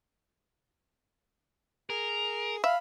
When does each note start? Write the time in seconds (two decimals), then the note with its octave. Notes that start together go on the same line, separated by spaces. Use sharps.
1.90 G#4 A#4
2.64 E5 F5 B5